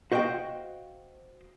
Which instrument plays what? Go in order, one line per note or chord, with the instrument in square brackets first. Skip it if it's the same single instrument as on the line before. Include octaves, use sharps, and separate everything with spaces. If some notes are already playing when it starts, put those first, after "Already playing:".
[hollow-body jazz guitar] F#4 C5 D#5 F5 G5